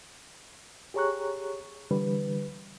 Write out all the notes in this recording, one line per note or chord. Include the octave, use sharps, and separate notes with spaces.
G4 G#4 C#5 A#5 C#6 F#6
D3 E3 G3 B4